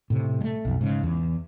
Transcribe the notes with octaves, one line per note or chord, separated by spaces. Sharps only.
A2 C3
G#3 A3
B1 F2
G#2 C#3
E2